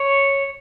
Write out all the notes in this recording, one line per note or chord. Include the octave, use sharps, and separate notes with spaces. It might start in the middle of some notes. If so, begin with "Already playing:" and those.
Already playing: C#5